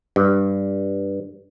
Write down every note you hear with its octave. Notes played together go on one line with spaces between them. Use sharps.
G2